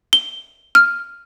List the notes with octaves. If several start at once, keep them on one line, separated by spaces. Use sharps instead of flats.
G7
F6